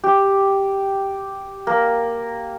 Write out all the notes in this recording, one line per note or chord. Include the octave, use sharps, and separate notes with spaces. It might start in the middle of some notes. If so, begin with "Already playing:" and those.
G4
A#3